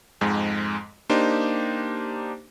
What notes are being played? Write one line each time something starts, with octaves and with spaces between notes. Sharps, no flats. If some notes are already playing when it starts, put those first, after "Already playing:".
F2 G#2 G#3
A#3 D4 D#4 G4 C5